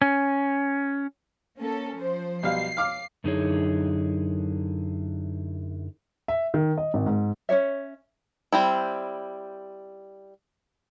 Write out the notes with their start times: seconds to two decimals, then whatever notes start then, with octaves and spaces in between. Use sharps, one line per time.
0.02 C#4
1.58 A#3 C#4 A4
1.97 F3 C5
2.43 B1 G3 F5 C7
2.77 F5 D6 F6
3.24 F#2 D3 D#4 E4 G#4 C#5
6.28 E5
6.54 D#3
6.78 D#5
6.94 G#1
7.06 G#2
7.49 C#4 D4 C#5 E5
8.52 G3 C4 E4